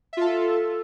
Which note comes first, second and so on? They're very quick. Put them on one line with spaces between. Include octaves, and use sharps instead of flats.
E5 F4 A4